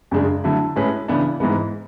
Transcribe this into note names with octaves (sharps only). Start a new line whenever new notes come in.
F#2 C#3 G#3 D4 G#4
D3 F#3 A3 E4
A2 G#3 C#4 G#4 B4
C#3 E3 B3 D4
G#2 E3 G#3 B3